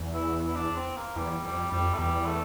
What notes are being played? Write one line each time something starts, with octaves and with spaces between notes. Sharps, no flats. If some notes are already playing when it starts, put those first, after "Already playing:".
Already playing: E2
E4
E4
D4
C4
A#3
E2 G3
F2 G3
F2 G3
A3
E2 G3
A3